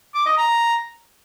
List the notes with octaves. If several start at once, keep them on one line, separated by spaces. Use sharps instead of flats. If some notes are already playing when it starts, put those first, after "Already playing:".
D6
D#5
A#5